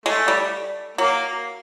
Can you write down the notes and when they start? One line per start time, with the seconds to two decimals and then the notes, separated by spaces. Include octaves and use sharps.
0.06 G#3 A3
0.28 G3
0.98 F#3 A#3